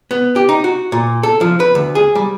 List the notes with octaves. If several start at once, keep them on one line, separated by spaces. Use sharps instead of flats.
B3
G4
D#4
F#4
A#2
A4
F3
B4
D2
G#4
G3